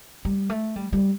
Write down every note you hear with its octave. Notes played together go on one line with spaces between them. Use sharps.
G3
A3
G3
G3